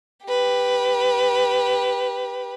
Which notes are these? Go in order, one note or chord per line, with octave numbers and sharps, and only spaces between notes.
G4 B4